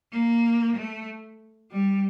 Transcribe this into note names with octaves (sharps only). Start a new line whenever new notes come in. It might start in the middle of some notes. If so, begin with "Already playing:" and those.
A#3
A3
G3